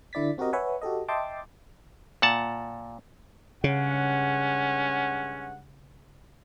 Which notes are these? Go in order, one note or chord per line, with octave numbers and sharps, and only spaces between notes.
D3 E4 D5 A6 B6
C4 F#4 G4 A#4 D#5
B4 C#5 E5 F#5 G#5
F#4 G4 A4 D#5
D#5 E5 G5 A5 C6 D6
A#2 F#5 A5
G2 C#3 G#3 C#4 F#5